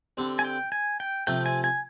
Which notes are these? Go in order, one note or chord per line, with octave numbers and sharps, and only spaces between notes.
D3 G3 C4
G#5
G5
G#5
G5
C3 F3 A3 G5
G#5
G#5